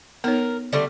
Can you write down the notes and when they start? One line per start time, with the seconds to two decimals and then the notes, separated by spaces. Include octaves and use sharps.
0.24 B3 D#4 A#4 C#5
0.73 D3 G3 A3